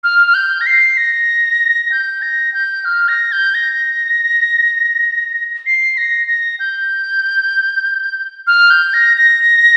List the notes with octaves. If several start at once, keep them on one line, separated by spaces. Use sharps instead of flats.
F6
F6
G6
A#6
C7
A#6
G6
A#6
G6
F6
A#6
G6
A#6
C7
A#6
A#6
G6
F6
G6
A#6
A#6